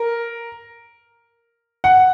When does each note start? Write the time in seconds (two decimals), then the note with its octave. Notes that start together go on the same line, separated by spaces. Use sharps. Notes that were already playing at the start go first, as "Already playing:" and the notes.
Already playing: A#4
1.84 F#5